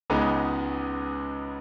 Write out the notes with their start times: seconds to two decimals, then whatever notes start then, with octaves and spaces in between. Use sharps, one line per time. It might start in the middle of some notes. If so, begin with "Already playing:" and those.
0.10 C#2 C#3 G#3 B3 D#4